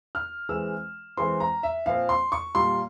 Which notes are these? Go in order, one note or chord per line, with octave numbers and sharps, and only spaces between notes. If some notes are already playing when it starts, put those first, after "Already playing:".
F6
E3 G#3 C4 E6
E3 G#3 C4 C6
A#5
E5
A#2 F3 C4 F5
C6
C#6
A#2 G3 A#3 C6